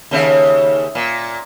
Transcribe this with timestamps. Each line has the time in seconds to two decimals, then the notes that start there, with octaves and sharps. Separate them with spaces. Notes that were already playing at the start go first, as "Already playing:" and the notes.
0.11 D#2 C#3 E5
0.95 A#2